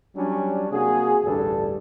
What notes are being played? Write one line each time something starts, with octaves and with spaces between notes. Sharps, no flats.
F#3 G3 C#4 D4
C3 A#3 F#4 G#4
A1 D2 G2 D4 A4